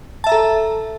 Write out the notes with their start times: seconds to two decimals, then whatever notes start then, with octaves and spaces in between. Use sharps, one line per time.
0.24 A5
0.27 E5
0.29 A#5
0.32 A4